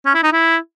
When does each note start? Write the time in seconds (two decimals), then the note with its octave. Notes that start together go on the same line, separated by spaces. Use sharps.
0.06 C#4
0.14 E4
0.23 D#4
0.32 E4